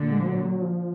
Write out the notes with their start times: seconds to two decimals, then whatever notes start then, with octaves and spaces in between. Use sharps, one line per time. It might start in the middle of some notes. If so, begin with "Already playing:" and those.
Already playing: A#2 D3
0.11 G#3
0.20 F3
0.27 F#3
0.45 F#3
0.62 F3